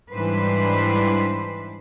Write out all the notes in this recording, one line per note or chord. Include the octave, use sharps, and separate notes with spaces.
G#2 E3 G3 D4 B4 C5